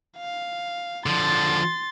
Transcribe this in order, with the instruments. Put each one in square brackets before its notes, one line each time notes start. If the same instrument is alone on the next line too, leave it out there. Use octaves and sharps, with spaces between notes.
[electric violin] F5
[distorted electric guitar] D3 F3 [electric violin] C6 A6